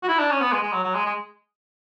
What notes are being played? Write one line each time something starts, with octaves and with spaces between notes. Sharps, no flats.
F#4
E4
D4
C#4
B3
G#3
G#3
F#3
F#3
G#3
G#3